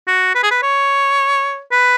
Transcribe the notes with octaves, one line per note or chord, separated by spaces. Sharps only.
F#4
B4
G#4
B4
C#5
B4